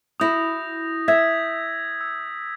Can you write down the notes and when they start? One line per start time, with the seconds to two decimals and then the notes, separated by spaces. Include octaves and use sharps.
0.20 E4 F#4 D#6 G6 A#6
1.08 E5 E6 G#6 B6
2.01 E6